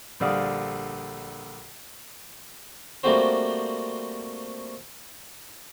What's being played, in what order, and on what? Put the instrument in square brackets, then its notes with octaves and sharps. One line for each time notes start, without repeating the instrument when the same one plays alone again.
[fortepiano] A#1 D3 G3 D5 F5 D#6
[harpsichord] G3 A3 A#3 C4 F#4 C5